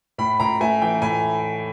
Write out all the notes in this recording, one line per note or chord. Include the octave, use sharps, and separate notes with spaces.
A2 B5
A2 A#5
A3 G#5
E3 G5
A2 G#5